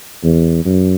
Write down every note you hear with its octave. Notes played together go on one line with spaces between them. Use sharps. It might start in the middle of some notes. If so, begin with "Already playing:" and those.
E2
F#2